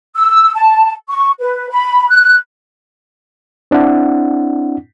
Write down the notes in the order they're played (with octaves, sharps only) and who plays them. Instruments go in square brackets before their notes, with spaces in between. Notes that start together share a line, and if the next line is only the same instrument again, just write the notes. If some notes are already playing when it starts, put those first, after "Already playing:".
[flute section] E6
A5
C#6
B4
B5
F#6
[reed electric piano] C4 D4 E4 F#5